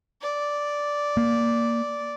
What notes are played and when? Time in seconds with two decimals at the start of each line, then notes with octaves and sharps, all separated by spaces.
0.22 D5
1.17 A#3